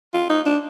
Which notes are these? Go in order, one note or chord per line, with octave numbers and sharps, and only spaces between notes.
F4
D#4
D4